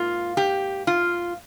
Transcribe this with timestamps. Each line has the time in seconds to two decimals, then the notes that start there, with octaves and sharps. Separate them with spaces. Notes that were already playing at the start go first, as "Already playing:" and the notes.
Already playing: G#2 A#3 F4
0.37 G4
0.87 F4